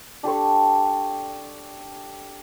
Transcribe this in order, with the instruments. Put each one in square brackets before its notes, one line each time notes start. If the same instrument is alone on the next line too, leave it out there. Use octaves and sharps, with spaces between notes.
[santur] D4 G4 A4 C#6